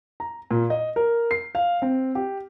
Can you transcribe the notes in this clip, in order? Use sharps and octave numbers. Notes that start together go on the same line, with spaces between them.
A#5
A#2
D#5
A#4
C7
F5
C4
G4